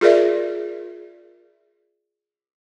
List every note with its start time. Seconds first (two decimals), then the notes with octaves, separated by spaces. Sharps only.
0.01 F4 G#4 A#4 D5 E5